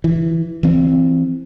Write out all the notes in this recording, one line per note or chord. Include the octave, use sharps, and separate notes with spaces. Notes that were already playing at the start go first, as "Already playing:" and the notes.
E3
E3 C4